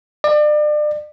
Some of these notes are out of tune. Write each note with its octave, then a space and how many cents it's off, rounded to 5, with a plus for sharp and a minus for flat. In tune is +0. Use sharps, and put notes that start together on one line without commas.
D5 +35